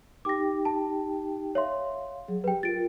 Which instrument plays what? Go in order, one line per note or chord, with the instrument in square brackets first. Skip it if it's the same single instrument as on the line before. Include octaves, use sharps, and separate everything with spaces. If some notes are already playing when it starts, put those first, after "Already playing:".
[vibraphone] D#4 G4 G5 [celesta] D6 A#6
[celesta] A5
[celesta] C#5 E5 C6 [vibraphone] F5
[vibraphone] F#3 G#4
[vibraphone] G4 [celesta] B4 G5
[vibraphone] F4 A#4 [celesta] A6 D7